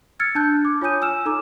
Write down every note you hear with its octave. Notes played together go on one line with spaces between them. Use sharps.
E6 F6 G#6 A6 C#7
D4 A5 F#6 G6
D6
F4 C#5 G#5 D#6 G6 D#7
G#5 E6 F6 E7
D#4 A4 A#5 D6